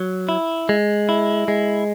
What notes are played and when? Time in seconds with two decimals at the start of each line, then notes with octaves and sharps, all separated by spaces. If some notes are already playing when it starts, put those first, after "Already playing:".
Already playing: F#3
0.29 E4
0.69 G#3
1.09 E4
1.48 G#3